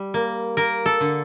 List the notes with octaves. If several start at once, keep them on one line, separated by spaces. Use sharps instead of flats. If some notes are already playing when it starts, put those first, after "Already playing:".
Already playing: G3
A#3
A#3 A#4
A4
D3